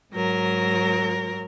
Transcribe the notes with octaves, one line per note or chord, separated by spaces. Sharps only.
G#2 F#3 A#4 A#6